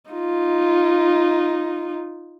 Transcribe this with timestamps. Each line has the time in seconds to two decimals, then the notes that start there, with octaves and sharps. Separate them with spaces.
0.11 D#4 F4